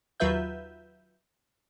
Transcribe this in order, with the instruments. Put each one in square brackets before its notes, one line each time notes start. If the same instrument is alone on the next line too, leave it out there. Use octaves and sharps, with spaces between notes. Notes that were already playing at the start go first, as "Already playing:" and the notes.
[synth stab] D#2 F#3 F4 B4 E5 G6